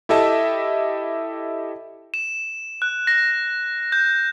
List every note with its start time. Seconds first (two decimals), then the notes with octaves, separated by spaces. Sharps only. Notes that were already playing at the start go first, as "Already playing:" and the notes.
0.09 E4 G4 A4 D#5 E5 A5
2.14 E7
2.82 F#6
3.07 A#6
3.92 G6